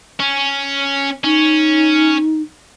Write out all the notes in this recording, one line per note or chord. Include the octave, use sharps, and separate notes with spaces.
C#4
C#4 D#4